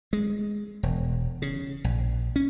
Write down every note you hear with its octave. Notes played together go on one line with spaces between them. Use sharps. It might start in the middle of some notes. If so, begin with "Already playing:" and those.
G#3
E1
C#3
A#1
C#4